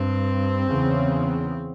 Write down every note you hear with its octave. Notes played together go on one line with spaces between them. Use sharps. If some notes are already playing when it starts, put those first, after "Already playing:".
Already playing: G2 C4
E2 C#3